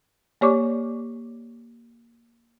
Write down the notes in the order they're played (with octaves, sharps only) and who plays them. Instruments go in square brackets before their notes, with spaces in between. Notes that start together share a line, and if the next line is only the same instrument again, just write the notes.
[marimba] A#3 G4 C#5 D5 C#6 D6